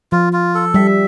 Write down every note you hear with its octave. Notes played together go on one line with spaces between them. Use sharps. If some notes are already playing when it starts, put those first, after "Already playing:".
F3 F4
F4
A4
G3 E5